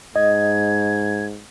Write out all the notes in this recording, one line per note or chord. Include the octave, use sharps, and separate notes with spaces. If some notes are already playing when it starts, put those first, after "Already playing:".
G#2 D#5 G#6